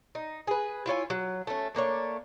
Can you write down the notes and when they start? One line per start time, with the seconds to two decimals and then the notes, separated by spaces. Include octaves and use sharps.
0.15 D#4
0.47 G#4 B4
0.86 E4 F4 C#5 G#5
1.10 F#3
1.47 A3 C#4
1.75 A3 A#3 D4 C#5